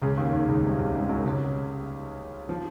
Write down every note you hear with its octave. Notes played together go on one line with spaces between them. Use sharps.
C#2 C#3
D#2 D#3
D#2 D#3
C#2 C#3
C2 C3
C#2 C#3
G#2 G#3
F#2 F#3
C#2 C#3
F3